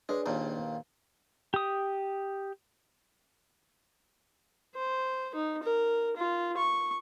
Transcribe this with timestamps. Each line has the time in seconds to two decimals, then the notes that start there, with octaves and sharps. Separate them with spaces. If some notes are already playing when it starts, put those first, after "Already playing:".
0.09 G#3 D4 G#4 B4 C#5 D5
0.26 A#1 D#2 A#2 A5
1.54 G4 D#6
4.75 C5
5.35 D#4
5.63 A#4
6.17 F4
6.57 C#6